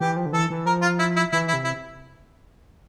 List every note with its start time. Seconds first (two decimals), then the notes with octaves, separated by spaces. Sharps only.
0.01 E3 G4
0.17 F3
0.26 D3
0.33 E3 A4
0.50 E3
0.66 F3 A#4
0.82 F4
0.99 E4
1.16 E4
1.33 E3 E4
1.48 E4
1.53 C3
1.64 E4